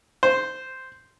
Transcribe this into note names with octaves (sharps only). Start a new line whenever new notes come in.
C5